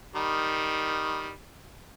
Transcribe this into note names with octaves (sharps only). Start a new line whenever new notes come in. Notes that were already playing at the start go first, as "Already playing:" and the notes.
D#3 G3